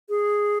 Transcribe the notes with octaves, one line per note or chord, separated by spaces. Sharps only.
G#4